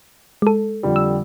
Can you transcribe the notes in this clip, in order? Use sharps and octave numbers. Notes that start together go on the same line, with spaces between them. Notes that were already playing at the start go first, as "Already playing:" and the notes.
G#3 A4
F2 D3 G3
E6